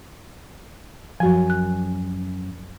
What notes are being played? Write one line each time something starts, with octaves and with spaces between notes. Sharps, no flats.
F#2 F3 F#4 G#5
F#6